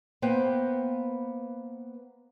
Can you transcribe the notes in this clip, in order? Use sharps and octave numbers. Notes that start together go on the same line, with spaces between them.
A#3 B3 B4 C5 G5